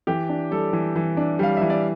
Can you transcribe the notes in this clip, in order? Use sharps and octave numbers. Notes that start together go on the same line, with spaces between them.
E3 G4
D4
G3 A4
E3
E3
D4
G3 F5
E3 E5
D5